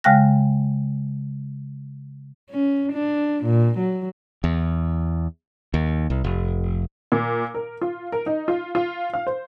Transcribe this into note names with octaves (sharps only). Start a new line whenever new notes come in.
C#3 G#3 F5 G5 F#6 A#6
C#4
D4
A#2
F#3
E2
D#2
C2
F1
A#2
A#4
F4
A#4
D#4
F4
F4
F5
C5